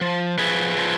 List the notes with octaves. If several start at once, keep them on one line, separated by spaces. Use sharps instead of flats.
F3
F3 G#4 B4
F3